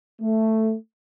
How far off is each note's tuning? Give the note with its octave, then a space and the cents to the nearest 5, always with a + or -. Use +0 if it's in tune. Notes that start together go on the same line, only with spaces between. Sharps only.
A3 +5